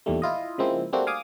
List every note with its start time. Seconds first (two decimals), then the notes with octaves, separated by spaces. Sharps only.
0.06 E2 A#2 D#3 G3 A3
0.22 E4 F4 D#5
0.58 C#3 F3 G#3 A#3 C4 E4
0.93 G3 A3 A#3 C4 D4 F#4
1.07 F5 G#5 D6 D#6